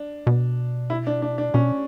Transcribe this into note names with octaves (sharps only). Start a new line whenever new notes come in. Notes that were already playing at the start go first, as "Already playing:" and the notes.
Already playing: D4
B2
E4
D4
D4
D4
B2 C#4